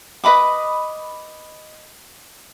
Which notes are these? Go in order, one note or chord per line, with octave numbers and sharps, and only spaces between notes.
B4 D#5 B5 D6